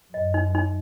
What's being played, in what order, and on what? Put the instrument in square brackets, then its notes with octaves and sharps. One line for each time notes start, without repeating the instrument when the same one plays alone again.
[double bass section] F#2 [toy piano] D#5
[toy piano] D#4
D#4